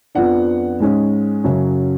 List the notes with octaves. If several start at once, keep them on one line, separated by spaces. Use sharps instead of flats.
F2 F3 B3 D4 F#5
G#2 G#3 C#4
F#2 C#3 F#3 C#4